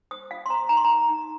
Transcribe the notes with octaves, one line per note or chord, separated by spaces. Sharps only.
C5 D#6
F4 F5
C6
C5 A#5
D#4 A#5
C6
A#5
A#4
D#4